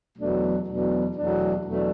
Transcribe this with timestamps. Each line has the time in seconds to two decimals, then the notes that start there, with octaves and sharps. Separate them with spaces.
0.18 E2 B2 F#3 A3 D4
0.67 E2 B2 F#3 A3 D4
1.15 E2 B2 F#3 A3 D4
1.64 E2 B2 F#3 A3 D4